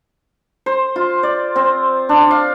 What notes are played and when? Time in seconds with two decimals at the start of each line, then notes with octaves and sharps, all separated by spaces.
0.66 C5
0.96 F4
1.23 D5
1.56 C4
2.09 D4
2.31 F5